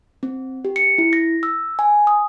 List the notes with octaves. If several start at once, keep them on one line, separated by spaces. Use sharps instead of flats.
C4
G4
C#7
E4
A#6
E6
G#5
D#6